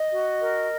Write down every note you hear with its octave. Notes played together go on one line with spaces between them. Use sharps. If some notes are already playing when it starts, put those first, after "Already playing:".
Already playing: D#5
F#4
A#4